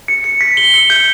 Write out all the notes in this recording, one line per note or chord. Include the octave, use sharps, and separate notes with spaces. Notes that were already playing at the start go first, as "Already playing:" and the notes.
C#7
C#7
B6
G7
C#7
G6